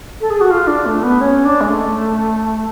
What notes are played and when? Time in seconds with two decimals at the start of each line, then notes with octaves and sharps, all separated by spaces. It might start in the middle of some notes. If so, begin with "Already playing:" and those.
0.21 A4
0.30 G#4
0.41 F#4
0.50 F4
0.67 D4
0.86 A3
1.03 B3
1.21 C#4
1.45 D4
1.61 G#3
1.69 A3